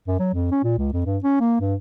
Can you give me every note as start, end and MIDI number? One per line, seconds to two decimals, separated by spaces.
0.08 0.17 42
0.19 0.29 54
0.34 0.47 41
0.51 0.62 61
0.63 0.76 46
0.78 0.90 37
0.93 1.03 41
1.06 1.18 43
1.23 1.39 61
1.40 1.56 58
1.60 1.75 43